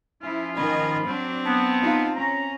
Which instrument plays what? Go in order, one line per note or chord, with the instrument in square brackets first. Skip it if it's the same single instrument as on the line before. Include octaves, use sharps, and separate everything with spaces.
[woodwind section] F3 C#4 F4 [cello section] E4
[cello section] D#3 D#5 [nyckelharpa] G#5 [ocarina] B5
[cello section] F#3 D4 [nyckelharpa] C4
[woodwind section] B3 [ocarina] A5
[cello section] D#4 F4
[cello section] C#4 [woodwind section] A#5